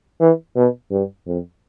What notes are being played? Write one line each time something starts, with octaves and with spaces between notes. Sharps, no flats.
E3
B2
G2
F2